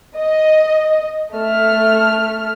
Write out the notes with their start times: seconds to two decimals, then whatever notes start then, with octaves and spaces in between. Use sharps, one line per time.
0.16 D#5
1.34 A3 F6